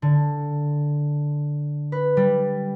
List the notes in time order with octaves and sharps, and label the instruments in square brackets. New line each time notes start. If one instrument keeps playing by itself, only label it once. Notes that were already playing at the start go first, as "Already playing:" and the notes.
[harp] D3
B4
G3